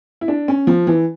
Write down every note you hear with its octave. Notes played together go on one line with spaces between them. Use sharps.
E4
D4
C#4
F3
E3